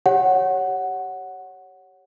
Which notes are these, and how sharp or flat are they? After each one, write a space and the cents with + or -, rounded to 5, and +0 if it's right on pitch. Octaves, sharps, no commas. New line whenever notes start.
G4 +0 C#5 +0 F#5 +0